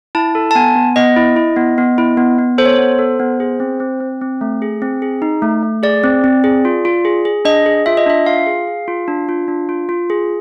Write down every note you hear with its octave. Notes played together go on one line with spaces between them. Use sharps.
E4 A5
A4
A5
B3 G#5
B3
B3 D#5
E4
E4
B3
B3
E4
B3
B3
A4 C5
C#5
C5
B3
A4
B3
G#4
C4
C4
C4
C4
A3
G#4
C4
G#4
D#4
A3
A3
G#4 D5
C4
C4
G#4
F4
F4
G#4
G#4
D4 D#5
G#4
F4 E5
D#5
D4 E5
F4 F5
G#4
G#4
F4
D4
F4
D4
F4
F4
G#4